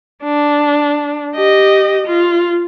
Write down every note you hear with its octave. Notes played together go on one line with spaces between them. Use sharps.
D4
G4 D#5
F4